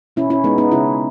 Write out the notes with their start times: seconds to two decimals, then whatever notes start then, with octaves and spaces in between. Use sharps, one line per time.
0.16 B2 C#4 E4
0.30 C#4 E4
0.44 G#3 B3 D#4
0.58 B3 D#4
0.71 C#3 C#4 E4